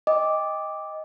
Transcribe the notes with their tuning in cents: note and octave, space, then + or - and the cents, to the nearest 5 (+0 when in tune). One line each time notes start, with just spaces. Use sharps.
D#5 +10 G5 +25 D6 +0